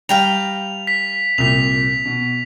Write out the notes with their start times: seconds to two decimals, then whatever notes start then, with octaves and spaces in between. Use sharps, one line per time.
0.09 G3 F5 G5 A#5 F7
0.87 B6
1.38 C2 A#2 B6 F7
2.05 B2